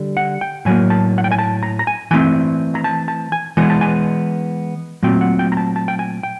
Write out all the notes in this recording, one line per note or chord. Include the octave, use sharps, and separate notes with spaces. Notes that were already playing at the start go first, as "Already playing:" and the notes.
Already playing: D3 G3
F#5
G5
A2 F#3 A#3 G#5
A5
F#5
G5
G#5
A5
A#5
A#5
G#5
E3 A3 C4 G#5
A#5
A5
A5
G#5
E3 G#3 B3 G#5
A5
G#5
A#2 F#3 A3 C4 G5
F#5
G5
A#5
A5
A5
G5
G#5
G5